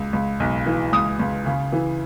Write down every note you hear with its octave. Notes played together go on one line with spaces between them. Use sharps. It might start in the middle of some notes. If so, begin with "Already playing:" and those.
Already playing: C#2
C#2
B1
E3
C#2 D#6
C#2
C#3
E3